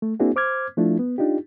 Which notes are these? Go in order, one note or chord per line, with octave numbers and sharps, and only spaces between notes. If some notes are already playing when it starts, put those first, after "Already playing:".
A3
A#3 C4 D4 E4 F#4 G#4
C5 D6 F6 G#6
F3 A3 D4 E4 F4
B3
D4 D#4 F4 G4